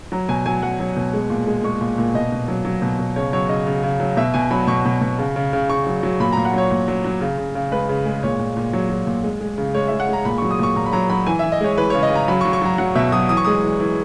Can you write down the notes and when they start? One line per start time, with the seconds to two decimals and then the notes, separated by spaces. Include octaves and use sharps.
0.12 F#3 A#5
0.29 B2 G#5
0.46 F#3 G#5
0.63 F#3 F#5
0.80 F#3
0.96 B2
1.13 G#3
1.30 A#2
1.47 G#3
1.64 G#3 C#6
1.81 A#2
1.98 A#2
2.14 B2 D#5
2.32 B2
2.48 F#3
2.65 F#3
2.82 B2
2.99 B2
3.16 C#3 C#5
3.33 F#3 C#5
3.49 C#3 D#5
3.67 C#3
3.83 C#3
4.00 F#3
4.17 B2 E5
4.34 B2 G#5
4.51 F#3 B5
4.67 B2 C#6
4.85 B2
5.01 B2
5.19 C#3
5.36 C#3
5.53 C#3
5.69 C#3 C#6
5.86 F#3
6.03 F#3
6.20 A#2 B5
6.33 A#2 A#5
6.45 F#5
6.53 F#3 C#5
6.71 A#2
6.88 F#3
7.04 F#3
7.21 C#3
7.38 C#3
7.55 C#3
7.72 G#3 B4
7.89 C#3
8.06 G#3
8.23 A#2 C#5
8.39 A#2
8.57 A#2
8.73 F#3 C#5
8.90 F#3
9.07 A#2
9.24 G#3
9.41 G#3
9.58 C#3
9.75 G#3 C#5
9.88 G#3 E5
10.00 F#5
10.09 G#3 A#5
10.25 A#2 B5
10.38 F#3 C#6
10.51 D#6
10.59 A#2 C#6
10.76 A#2 A#5
10.86 B5
10.93 F#3 A#5
11.10 F#3 B5
11.26 E3 G#5
11.39 E3 E5
11.52 D#5
11.61 G#3 C#5
11.77 E3 B4
11.90 C#3 C#5
12.03 D#5
12.10 C#3 A#5
12.28 F#3 B5
12.41 C#6
12.45 F#3
12.53 C#6
12.62 F#3 A#5
12.78 F#3 F#5
12.95 B2 E5
13.12 F#3 D#6
13.29 E3 D#6
13.37 C#6
13.45 G#3 D#6
13.63 E3
13.80 E3